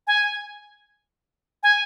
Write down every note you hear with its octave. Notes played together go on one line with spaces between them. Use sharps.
G#5
G#5